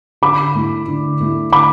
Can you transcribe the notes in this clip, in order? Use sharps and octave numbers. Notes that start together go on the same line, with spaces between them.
D3 B5 D6
A3 E4
D3
A3 E4
D3 B5 D6